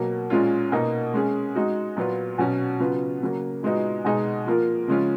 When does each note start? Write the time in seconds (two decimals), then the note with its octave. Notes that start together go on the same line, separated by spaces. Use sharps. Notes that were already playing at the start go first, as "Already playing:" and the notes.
Already playing: B2 F#3 A#3
0.30 A#2 G#3 C#4 F4
0.72 B2 A#3 D#4
1.14 G#3 C#4 G#4
1.55 G#3 D#4 F#4
1.97 A#2 F#3 B3 F4
2.38 B2 F#3 C#4 F#4
2.80 C#3 F#3 B3 F4
3.21 C#3 F#3 A#3
3.63 A#2 G#3 B3 D#4 F#4
4.05 B2 G#3 D#4 G#4
4.46 F3 A#3 F4 A#4
4.88 C#3 F3 G#3 C#4 F4